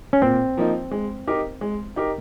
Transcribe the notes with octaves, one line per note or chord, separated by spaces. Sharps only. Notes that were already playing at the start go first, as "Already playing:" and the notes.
C#4
A#2 C4
F3 A#3 D#4
G#3
D#4 G4 A#4
G#3
D#4 G4 A#4